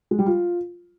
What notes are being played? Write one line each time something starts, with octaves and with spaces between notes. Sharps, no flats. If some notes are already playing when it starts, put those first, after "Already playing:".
G#3
G3
F4